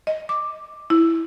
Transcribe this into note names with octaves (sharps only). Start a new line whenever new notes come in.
D#5
D6
E4